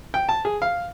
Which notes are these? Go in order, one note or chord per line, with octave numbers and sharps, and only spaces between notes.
G5
A5
G#4
F5